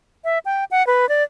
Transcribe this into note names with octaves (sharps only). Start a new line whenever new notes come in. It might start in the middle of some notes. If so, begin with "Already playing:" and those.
E5
G5
F#5
B4
D5